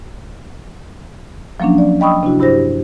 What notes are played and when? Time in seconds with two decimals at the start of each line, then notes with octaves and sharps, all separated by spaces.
1.60 F3 F#3 A#3 C#4 D4
1.78 D5
2.00 D#5 G5 B5 C#6 D#6 E6
2.23 C3 D4 E4 F#4
2.40 G2 E4 G4 C5 A#6